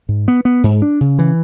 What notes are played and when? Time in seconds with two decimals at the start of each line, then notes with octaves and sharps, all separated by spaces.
0.09 G#2
0.28 B3
0.45 B3
0.64 G#2
0.82 D4
1.01 C#3
1.19 E3